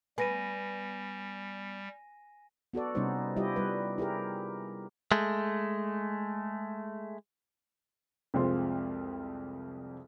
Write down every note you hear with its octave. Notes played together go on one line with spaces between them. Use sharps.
G3 B3 G#5 A#6 D#7
B3 F#4 A4 D5
C3 G3 B3 C#4 D#4 C5
G3 E4 F4 G4 D#5
G3 B4
E4 G4 G#4 A#4
G#3 A3
C2 F2 G#3 C4 F4 C6